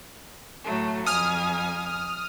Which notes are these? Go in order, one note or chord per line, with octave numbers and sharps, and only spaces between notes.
A2 F#3 A3
F2 G#5 D#6 F6